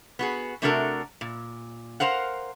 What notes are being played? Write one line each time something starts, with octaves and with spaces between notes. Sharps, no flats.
B3 F#4 G#4
C3 A3 D4 F#4 A4 A#4
A#2
A#4 C5 F5 F#5